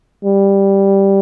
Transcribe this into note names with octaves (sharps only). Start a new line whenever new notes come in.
G3